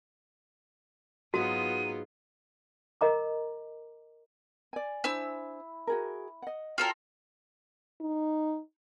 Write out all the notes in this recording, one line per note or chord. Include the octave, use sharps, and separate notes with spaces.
G#2 F#3 B3 D#4 F4 F#4 D#7
A#4 D#5 A#5 D6
D5 G#5
D4 E4 C5 G#5 E6
F#4 G#4 A#4
D#5 F#5
F4 F#4 A4 A#4 C#5 G5
D#4